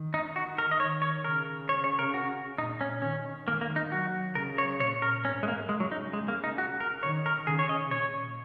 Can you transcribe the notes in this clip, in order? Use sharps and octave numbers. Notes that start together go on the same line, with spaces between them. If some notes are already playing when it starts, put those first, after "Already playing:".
Already playing: D#3
D#4
F#4
A#4
D#5
C#5
C#5
C#3 A#4
C#5
C#5
A#4
F#4
A#2 D#4
C#4
D#3 C#4
A#3
A#3
D#4
F#3 F#4
C#3 A#4
C#5
A#2 C#5
A#4
G#2 C#4
G#3
A#3
C#3 G#3
F#3
D#4
G#3
A#3
D#4
F#4
A#4
D#3 C#5
A#4
C#3 G#4
C#5
D#5
A#2 C#5